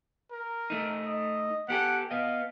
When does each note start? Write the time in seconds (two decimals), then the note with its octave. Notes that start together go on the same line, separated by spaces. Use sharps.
0.31 A#4
0.70 A3 D#4
1.06 D#5
1.68 B3 G4 A4 F#5
2.11 B3 D#5 F5